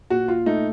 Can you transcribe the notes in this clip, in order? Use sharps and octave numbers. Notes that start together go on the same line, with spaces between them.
A#2 F#4
F4
A3 D#4